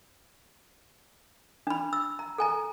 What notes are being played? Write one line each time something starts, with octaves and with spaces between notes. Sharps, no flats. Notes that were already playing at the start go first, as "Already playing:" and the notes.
D4 B5
E6
A#5
A4 G#5 A#5